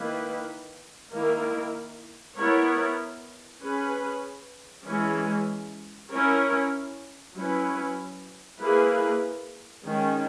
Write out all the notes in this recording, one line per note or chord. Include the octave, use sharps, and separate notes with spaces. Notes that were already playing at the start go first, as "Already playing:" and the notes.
Already playing: D#3 A#3 E4 B4
D#3 A#3 E4 A#4
B3 E4 A#4 C#5
C#4 G#4 B4
E3 G#3 C#4
C#4 E4 A#4 C#5
F#3 C#4 E4 B4
A#3 E4 G#4 B4
D#3 G#3 C#4